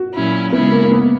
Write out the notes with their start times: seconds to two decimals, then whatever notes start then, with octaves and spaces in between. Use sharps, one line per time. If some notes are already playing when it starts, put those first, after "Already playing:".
Already playing: F#4
0.14 A#2 F#3 C#4 E4
0.52 C#3 G#3 B3 C#4 E4
0.72 A#3
0.83 A#3
0.91 B3